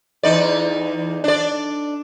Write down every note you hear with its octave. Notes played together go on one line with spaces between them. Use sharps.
E2 D#4 D5
D4 D5